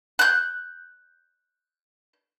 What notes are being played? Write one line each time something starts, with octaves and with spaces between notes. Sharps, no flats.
F#6 G6